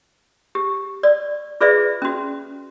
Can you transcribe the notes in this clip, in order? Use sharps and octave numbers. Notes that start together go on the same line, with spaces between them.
G4
D5
F4 G#4 B4 D5 E5
C#4 F#4